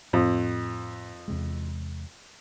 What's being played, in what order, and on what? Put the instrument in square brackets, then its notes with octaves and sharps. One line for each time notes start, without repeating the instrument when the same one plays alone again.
[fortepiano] F2 [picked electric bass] A2 C4
[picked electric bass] E2 C3 G#3